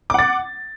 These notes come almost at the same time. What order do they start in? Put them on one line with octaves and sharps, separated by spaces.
D6 F#5 A6